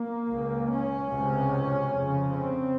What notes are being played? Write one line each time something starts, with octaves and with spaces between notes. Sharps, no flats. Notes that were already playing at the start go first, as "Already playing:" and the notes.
Already playing: A#3
C#2 C#3
C#4
C#2 C3
F2 C#3
C4